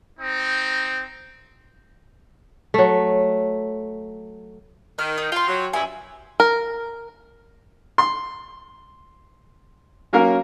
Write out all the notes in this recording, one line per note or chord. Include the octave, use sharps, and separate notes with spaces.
C4 D#4
F#3 A3
D#3 F6
D#4
F4 G5 C6
F#3
G2 E4 G#5
A#4
C6
F#3 A#3 C#4 A#4 F5